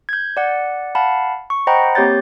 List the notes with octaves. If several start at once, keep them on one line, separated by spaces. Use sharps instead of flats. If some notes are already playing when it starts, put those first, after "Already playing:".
G6 G#6
D5 F#5
F5 F#5 A5 B5
C#6
C5 D#5 F#5 G5 A#5 B5
A#3 C4 G4 C#5 G6 A6